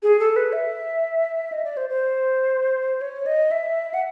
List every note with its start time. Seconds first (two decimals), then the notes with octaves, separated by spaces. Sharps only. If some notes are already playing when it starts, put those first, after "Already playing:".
0.03 G#4
0.19 A4
0.36 B4
0.53 E5
1.52 D#5
1.64 D5
1.77 C5
1.90 C5
3.01 C#5
3.26 D#5
3.51 E5
3.94 F#5